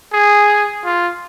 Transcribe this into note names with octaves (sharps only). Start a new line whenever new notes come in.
G#4
F4